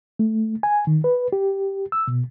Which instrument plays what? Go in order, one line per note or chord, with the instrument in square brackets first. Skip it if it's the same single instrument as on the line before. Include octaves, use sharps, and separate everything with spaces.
[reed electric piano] A3
G#5
D#3
B4
G4
E6
B2